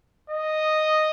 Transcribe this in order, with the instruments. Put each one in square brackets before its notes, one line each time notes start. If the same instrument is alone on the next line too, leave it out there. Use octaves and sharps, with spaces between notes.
[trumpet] D#5